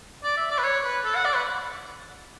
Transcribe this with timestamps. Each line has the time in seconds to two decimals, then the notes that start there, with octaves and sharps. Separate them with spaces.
0.24 D5
0.37 E5
0.51 D5
0.58 B4
0.64 C#5
0.85 B4
1.05 A4
1.15 F#5
1.25 D5
1.35 B4